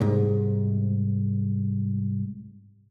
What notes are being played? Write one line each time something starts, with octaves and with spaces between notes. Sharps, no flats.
C2 G#2